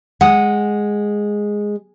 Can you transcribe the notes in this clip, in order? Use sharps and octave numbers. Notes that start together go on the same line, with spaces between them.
G#3 F#5 D#6